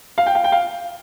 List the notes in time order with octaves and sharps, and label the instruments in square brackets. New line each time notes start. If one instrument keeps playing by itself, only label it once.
[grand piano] F5
G5
F5
G5
F5